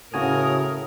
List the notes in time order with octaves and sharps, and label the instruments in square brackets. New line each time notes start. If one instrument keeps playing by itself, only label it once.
[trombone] A2 [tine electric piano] C#3 F#4 G#5 [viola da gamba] A#4 [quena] D#6